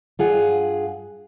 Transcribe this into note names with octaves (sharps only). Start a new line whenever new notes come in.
G2 F4 G#4 F#5